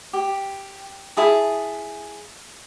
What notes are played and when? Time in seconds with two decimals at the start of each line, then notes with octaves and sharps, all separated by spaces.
0.13 G4
1.17 E4 G#4 A5